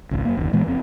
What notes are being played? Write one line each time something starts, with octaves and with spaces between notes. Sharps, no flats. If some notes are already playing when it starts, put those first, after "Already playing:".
G#1 C#2
F#2 C#3 A#3
F#1 D#2
A#2 E3 G#3 B3
F#1 F2 C4